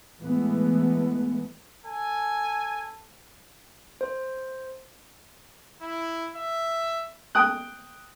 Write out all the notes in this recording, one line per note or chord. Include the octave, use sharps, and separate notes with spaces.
E3 G#3 A3 B3
A4 G#5
C5
E4
E5
G5 D#6 F#6